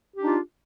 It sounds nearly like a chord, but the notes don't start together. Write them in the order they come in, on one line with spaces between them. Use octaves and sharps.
G4 D4 D#4 F4